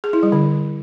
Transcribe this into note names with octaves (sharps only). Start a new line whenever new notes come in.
G#4
E4
G3
D3